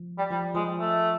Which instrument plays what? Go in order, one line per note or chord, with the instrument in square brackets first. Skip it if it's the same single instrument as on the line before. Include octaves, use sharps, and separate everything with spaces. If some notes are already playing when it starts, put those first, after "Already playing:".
Already playing: [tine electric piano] F3
[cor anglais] G3
[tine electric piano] F3 [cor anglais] G3
[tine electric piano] F3 [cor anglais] G#3
[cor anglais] A3